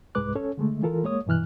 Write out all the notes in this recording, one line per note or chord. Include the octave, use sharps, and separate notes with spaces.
C2 G#2 G#3 B4 D6 F#6
C#4 A4 C#5
D3 G#3 A3
E3 F4 A4 A#4
G#3 A#3 C#5 D#6
G2 B2 E3 F6 F#6